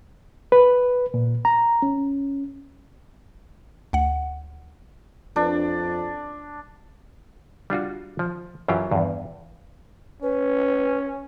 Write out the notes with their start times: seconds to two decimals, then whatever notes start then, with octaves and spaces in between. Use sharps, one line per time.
0.52 B4
1.14 A#2
1.45 A#5
1.82 C#4
3.93 D2 F#5
5.36 F2 D4
7.70 G3 D4 F4 F#4
8.19 F3
8.68 F#2 E3 F#3 F4 G4 A#5
8.91 E2 G2
10.22 C#4 B4